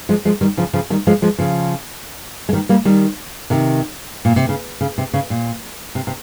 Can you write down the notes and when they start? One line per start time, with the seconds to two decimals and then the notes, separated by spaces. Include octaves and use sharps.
0.09 F3 G#3
0.25 F3 G#3
0.41 D#3 G3
0.57 C#3 F3
0.73 C#3 F3
0.90 D#3 G3
1.07 F3 G#3
1.22 F3 G#3
1.38 C#3 F3
2.49 G#3
2.53 D#3 G3
2.69 G3 A#3
2.85 D#3 G3
3.50 C3 D#3
4.25 A#2
4.36 C3
4.49 C#3
4.81 C#3
4.98 C3
5.13 C#3
5.30 A#2
5.95 C3
6.07 C3